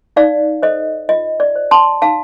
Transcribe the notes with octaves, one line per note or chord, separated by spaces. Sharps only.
D#4 D5 F5
A4 C5 D#5
F4 D#5
D5
C5
A5 C6
D#4 F5 A5